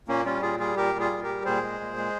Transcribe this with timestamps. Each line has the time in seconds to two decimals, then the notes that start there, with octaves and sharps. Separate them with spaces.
0.08 A#2 A#3 C#4
0.25 G3 C#4 F4
0.42 A#2 F4 G#4
0.60 G3 F4 G#4
0.76 A#2 G4 A#4
0.94 G3
1.00 F4 G#4
1.11 A#2
1.23 G4 A#4
1.29 G3
1.45 A#2 G#4 C5
1.63 G#3
1.80 A#2
1.97 G#3